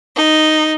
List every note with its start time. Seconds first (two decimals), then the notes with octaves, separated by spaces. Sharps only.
0.16 D#4